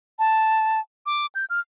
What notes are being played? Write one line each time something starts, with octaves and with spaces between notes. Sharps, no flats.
A5
D6
G6
F6